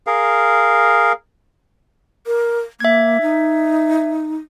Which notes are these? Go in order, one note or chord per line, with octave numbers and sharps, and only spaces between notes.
G#4 A#4 F5
A#4
A#3 E5 G#6
D#4